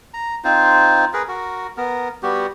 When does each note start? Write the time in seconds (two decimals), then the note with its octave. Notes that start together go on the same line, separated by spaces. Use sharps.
0.14 A#5
0.44 C4 D#4 F4 C5
1.13 G#4 A#4 B4
1.28 F#4 A#4
1.77 B3 A#4
2.23 G3 B3 F#4 G4